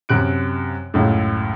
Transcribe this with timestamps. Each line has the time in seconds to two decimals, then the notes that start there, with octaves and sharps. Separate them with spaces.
0.09 F#2 C3 F#6 D7
0.94 C#2 F#2 A2